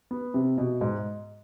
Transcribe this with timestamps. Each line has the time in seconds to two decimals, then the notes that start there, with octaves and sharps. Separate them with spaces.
0.11 B3
0.34 C3
0.58 B2
0.81 G#2